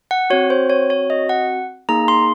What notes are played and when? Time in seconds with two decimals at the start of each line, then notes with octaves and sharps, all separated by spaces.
0.11 F#5
0.30 C4 F#4 C#5
0.50 C5
0.70 C#5
0.90 C#5
1.10 D#5
1.29 F#5
1.89 A#3 D#4 G#4 A#5
2.08 C6